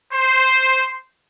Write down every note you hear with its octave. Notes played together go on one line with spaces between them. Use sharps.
C5